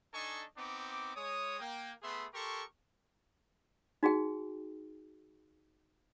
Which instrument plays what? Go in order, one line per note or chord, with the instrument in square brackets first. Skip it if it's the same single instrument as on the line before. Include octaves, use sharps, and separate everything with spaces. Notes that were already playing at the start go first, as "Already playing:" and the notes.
[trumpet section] D4 D#4 A4 D#5 G#5 C#6
B3 C4 D#4 D6
G#3 C#5 D#6
A#3 G5
A3 B3 G#4 B4 E5 C6
G4 A4 A#4 C6 C#6
[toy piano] D#4 F#4 G#4 G5